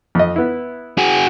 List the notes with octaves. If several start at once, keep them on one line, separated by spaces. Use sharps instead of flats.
F2 D#5
B3 E4
F#4 G#4